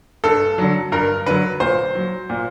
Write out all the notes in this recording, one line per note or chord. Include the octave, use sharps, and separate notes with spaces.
G2 A4
D3 F#3
G2 A#4
D3 F#3 B4
A#2 C5
F#3
A#2